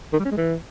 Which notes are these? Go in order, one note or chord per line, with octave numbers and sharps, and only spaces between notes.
D#3
G3
C#4
G#3
E3